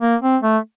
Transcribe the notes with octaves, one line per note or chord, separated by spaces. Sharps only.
A#3
C4
A3